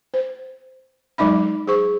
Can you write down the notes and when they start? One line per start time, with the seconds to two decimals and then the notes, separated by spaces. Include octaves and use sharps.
0.14 C5
1.18 F#3 G#3 D#4 E5 B5
1.67 G#4 C5 C#6